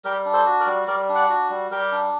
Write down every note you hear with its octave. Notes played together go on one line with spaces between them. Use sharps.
G3 G4 A#4
D4
A4 C5
F#4
A#4 D5
G3
G3 A#4 D5
D4
D5 F#5
F#4
G3
G3 G4 A#4
D4